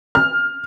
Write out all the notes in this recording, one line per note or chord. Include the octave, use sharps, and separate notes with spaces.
F6